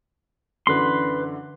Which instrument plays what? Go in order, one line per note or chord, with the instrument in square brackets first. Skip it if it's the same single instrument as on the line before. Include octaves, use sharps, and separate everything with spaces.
[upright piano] F#2 D3 E3 [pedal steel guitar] B4 C6